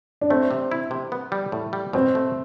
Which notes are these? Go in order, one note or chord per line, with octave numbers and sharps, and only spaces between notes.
D4
A3 C4
C3
E4
C3
B3
G3
A2
G3
B2 C4
A3